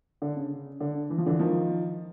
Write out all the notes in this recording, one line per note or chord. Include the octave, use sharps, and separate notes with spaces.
D3
C#3
D3
E3
F3
D3 E3
D#3 F3